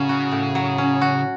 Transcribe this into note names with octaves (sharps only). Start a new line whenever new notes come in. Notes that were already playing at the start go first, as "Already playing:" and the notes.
Already playing: A2 C#3 F#3 C#4
F#4
A2
F#3
C#4
F#4